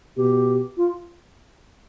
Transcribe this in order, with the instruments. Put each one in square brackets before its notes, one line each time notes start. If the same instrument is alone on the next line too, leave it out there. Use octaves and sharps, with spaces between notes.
[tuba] B2 [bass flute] G4
[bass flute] F4